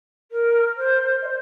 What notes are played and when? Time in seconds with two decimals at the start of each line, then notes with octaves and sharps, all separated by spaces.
0.31 A#4
0.76 C5
1.22 D#5
1.25 C5